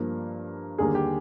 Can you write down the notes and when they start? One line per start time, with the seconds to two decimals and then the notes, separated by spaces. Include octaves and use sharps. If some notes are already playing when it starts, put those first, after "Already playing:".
Already playing: G2 F3 A#3
0.78 D#2 D3 G3 A#3 G#4
0.95 G4